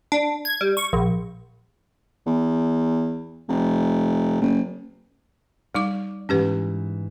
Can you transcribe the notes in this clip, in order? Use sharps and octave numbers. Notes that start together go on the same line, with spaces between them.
D4
G#6
G3
C#6
A#1
E2
F1
F#1
G3 D#4 D5 D6
G#2 E3 C#4 G4 B4